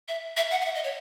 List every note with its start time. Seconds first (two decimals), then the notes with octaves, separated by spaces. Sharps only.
0.08 E5
0.37 E5
0.51 F#5
0.61 F#5
0.65 E5
0.75 D#5
0.84 C#5